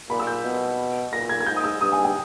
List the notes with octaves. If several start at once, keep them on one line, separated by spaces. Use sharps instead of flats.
A#2 B5
E6
G6
B2
A#2 A#6
G#6
G#6
G#2 G6
D#6
E6
G2 D#6
G#5
G5